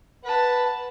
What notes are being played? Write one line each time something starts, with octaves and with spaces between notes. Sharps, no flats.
B4 F#5 A5